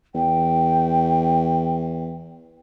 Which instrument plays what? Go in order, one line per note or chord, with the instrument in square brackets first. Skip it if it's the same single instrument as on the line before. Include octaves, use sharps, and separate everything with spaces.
[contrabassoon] E2 [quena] G5